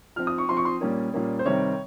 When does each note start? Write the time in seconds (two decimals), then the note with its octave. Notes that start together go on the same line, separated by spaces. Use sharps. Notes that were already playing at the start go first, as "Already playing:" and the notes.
0.16 F3 C4 F6
0.27 D#6
0.38 C#6
0.48 F3 C4 C6
0.57 C#6
0.65 C6
0.81 A#2 G3 A#3 C#4
1.13 A#2 G3 A#3 C#4
1.39 C5
1.45 C3 D#3 G3 C4 C#5